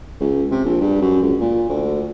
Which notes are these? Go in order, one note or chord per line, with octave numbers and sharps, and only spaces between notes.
C#2
C3
A#1
G2
F#2
C#2
A#2
D2